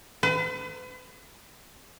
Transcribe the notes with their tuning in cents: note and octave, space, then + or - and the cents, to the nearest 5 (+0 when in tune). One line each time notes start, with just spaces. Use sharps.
B4 +40